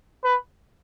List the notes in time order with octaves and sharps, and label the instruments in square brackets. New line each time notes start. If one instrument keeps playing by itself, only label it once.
[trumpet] B4